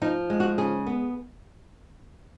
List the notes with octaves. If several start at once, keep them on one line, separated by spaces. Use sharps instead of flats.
F3 D#4
G#3
F#4
C#3 G#4
B3